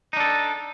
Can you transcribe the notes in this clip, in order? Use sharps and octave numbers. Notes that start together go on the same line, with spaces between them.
D4 D#4 A4